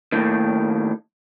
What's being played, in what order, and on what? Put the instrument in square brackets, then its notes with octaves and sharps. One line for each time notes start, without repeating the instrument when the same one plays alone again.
[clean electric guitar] D#2 A2 D#3